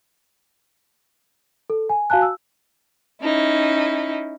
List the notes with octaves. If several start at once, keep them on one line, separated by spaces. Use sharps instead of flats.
A4
G#5
F#4 F5 G#5 A5 F#6
E6
C#4 D#4 E4